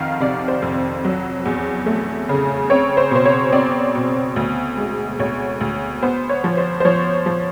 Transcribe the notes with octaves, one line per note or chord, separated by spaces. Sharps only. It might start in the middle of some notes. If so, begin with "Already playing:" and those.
Already playing: F2 D#3 F5 F#5 A#5
C3 D5
C5
F2
F#3
E2
A3
C#3
C4 C#5
C5
B2 C5
C#5
C4 D5
B2
D2
G#3
D2 C#5
D2
B3 C5
C#5
F3
C5
C5
F3 C#5
F3